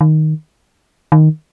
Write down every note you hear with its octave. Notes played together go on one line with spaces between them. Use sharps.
D#3
D#3